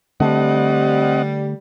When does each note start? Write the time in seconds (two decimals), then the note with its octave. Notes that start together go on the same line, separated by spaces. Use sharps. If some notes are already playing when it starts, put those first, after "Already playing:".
0.20 D3 G3 A3 C4 D#5 F#5